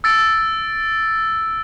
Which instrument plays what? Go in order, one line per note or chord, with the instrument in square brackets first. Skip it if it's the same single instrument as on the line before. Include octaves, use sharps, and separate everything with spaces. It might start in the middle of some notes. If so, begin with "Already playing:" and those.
[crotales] E6 A6 D7